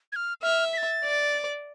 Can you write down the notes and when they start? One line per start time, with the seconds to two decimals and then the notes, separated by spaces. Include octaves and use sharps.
0.12 G#6
0.16 F6
0.43 E5 F6
0.73 B6
0.77 A6
1.04 D5